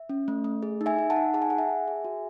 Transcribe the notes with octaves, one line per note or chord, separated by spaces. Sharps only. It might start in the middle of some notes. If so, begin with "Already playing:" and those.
Already playing: E5
C#4
A3
A3
G#4
D#4
E5 G#5
D#4
F#5 A5
D#4
G#4 A5
G#5
G#4 F#5
E5 G#5
G#4
G#4
F#4